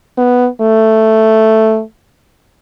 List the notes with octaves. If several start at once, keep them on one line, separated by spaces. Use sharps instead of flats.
B3
A3